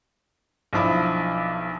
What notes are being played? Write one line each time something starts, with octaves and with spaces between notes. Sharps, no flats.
B1 F3 D4 E4 B5 D#6